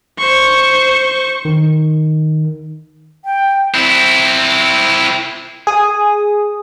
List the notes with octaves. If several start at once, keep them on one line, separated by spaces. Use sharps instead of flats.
C5 C#6
D#3
G5
C4 E4
G#4 D#6